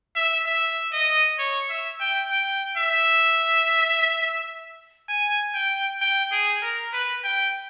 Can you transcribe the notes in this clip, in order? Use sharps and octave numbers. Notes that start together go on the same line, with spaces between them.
E5
E5
D#5
C#5
E5
G5
G5
E5
G#5
G5
G5
G#4
A#4
B4
G5